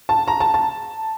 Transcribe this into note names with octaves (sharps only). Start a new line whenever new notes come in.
A5
A#5
A5
A5